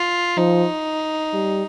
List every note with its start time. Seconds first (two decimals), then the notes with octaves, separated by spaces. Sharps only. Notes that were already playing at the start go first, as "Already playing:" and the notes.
Already playing: F4
0.37 F3 D#4
1.34 G3